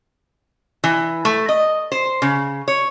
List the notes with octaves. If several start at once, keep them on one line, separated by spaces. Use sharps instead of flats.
E3
A3
D#5
C5
C#3
C#5